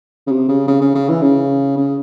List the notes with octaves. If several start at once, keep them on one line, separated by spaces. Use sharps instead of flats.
C#3
C3
C#3
C#3
C#3
C#3
E3
C#3
C#3